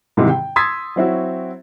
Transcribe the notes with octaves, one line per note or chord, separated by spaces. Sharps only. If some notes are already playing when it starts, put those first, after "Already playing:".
G#2 C3 D#3 E3 G#3
G5
C6 D#6 E6 G#6 A6 B6
F#3 C4 E4 F#4